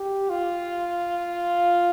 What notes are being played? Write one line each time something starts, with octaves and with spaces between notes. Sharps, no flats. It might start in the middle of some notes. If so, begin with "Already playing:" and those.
Already playing: G4
F4